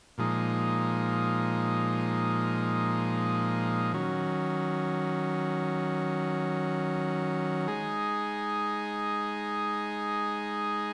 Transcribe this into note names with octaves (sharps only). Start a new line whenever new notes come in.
A#2 F3 G#3 D#4
D#3 F#3 C#4
G#3 D#4 G#4